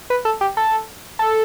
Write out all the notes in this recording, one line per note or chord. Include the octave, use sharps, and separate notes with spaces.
B4
A4
G4
A4
A4